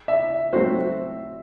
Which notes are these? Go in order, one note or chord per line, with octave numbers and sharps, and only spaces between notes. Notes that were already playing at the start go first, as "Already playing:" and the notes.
E5
F#3 A3 C4 F#4 C5